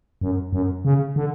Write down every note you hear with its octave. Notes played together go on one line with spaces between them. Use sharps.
F#2
F#2
C#3
D3